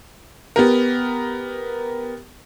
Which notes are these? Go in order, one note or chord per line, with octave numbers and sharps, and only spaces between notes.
B3 G4 A#4